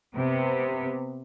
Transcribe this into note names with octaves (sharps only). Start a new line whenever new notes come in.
C3 B3